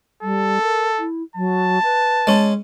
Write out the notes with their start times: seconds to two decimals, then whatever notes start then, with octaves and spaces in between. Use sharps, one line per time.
0.23 G3 A4
0.62 A#4
0.99 E4
1.36 F#3 A5
1.84 B4
2.27 G#3 C#4